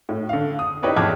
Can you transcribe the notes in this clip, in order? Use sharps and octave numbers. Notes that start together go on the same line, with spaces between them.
A2
D3 F5
D#6
D#4 E4 G4 B4 C#5 D5
B1 E2 G5 A5 D6 G#6